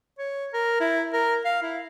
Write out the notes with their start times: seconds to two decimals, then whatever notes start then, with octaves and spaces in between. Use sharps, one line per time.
0.18 C#5
0.53 A#4
0.80 E4
1.13 A#4
1.45 F5
1.62 E4